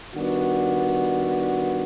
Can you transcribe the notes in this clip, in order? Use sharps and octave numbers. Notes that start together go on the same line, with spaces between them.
D#3 G3 B3 D4 F#4